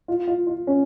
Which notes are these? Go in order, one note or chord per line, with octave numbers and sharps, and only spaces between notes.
F4
F4
F4
C#4